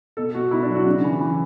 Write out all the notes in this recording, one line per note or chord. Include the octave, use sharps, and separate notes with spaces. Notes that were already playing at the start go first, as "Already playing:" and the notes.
B2 A4
B2 F#4
B2 E4
D4
F#3
F#4
C#3
E3
E3